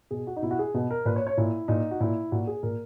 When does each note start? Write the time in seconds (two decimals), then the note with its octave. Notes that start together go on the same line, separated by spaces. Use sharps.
0.11 B2 G#4
0.27 F#4
0.36 D#4
0.42 B2 E4
0.51 F#4
0.59 G#4
0.74 B2
0.91 A#4
1.06 A#2 B4
1.16 C#5
1.27 C#5
1.37 A#2 E4
1.68 A#2 D#4
1.91 F#4
2.00 A#2 E4
2.32 A#2 F#4
2.47 G#4
2.63 A#2 A#4